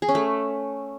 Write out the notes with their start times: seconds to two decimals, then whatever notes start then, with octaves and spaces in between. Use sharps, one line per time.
0.02 G#4
0.09 C#4
0.15 A3